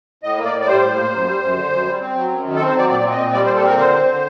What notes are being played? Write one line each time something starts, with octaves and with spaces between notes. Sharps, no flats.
A2 D#5
A#3
D5
A2
D5
G3 C5
A2
A#3
F#2
G3
F#2
D3
F#2
G3
C4
F#3
F#2
D#3
A4
C4
C5
F#3 D5
A#2 D5
C4
D#5
A#2
G3 D5
C5
A#2
A4
C4 A#4
D3 C5
C4
D3